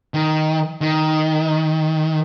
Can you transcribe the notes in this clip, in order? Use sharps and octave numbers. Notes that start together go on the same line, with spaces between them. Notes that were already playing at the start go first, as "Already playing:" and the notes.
D#3
D#3